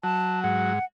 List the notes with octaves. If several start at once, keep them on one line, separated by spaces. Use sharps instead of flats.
F#3 A5
G#2 F#5